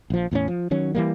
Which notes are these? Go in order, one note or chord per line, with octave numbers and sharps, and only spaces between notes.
A#1 F3
E2 A2 A3 C#4
F3
D#3 F#3 C#4
E3 G3 A#3